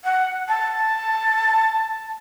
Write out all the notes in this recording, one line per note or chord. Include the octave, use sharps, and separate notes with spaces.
F#5
A5